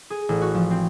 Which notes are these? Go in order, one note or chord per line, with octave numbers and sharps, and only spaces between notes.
G#4
A1
F#4
F3
C4